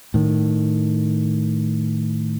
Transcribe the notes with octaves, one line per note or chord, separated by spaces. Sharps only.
A2 D#3